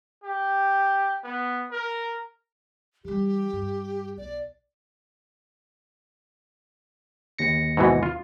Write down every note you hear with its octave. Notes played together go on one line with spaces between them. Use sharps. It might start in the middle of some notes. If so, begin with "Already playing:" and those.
G4
B3
A#4
E3 G3 G4
G2
B1 D5
D#2 A#6 C#7
G#2 B2 E3
F4